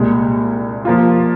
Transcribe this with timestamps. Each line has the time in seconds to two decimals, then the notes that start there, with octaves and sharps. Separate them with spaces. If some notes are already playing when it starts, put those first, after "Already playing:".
Already playing: C2 A#2 G#3
0.85 F3 A#3 F4